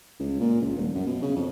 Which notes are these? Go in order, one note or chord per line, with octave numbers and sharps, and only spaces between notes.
C#2
A#2
C#2
D#1
F#2
B2
C#3
F2